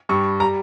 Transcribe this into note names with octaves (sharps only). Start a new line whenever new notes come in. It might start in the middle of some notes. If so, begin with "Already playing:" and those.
G2 G3 C#6
G3 A#5